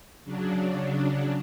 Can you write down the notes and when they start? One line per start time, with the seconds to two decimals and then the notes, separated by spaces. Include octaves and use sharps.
0.24 C#3 F#3 D4